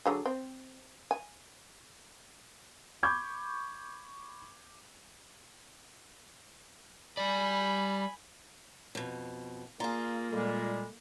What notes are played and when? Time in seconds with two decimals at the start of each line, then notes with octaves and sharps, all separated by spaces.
0.06 D3 F#3 G#4
0.26 C4
1.11 G#5
3.03 B5 C#6 D6 G6 G#6
7.17 G3 D5 G#5 B5
8.95 F2 B2
9.80 A#3 F4 G#4 D5 A#5 C6
10.32 A#2 G3 G#3 A4